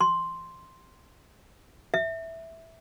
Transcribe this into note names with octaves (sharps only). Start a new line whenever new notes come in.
C6
E5